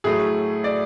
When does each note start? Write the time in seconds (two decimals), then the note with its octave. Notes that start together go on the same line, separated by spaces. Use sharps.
0.04 A2 F#3 A3 G#4
0.64 D5